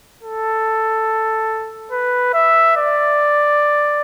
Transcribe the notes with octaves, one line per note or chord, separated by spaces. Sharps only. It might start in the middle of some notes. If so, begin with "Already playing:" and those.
A4
B4
E5
D5